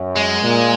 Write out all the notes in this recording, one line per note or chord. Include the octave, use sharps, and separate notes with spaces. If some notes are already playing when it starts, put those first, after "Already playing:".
Already playing: F#2
G#3
A#2